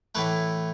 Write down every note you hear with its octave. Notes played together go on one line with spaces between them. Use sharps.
A2 E3 A3 B4